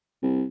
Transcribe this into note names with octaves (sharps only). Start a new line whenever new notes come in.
C2